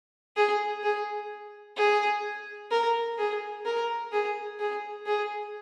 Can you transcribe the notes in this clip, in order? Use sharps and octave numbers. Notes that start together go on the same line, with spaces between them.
G#4
G#4
G#4
A#4
G#4
A#4
G#4
G#4
G#4